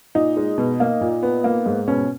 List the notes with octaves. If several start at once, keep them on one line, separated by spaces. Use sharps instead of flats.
A#2 D#4
G#3
B2
A#3
A#2
B3
A#3
G#2
B2 C#4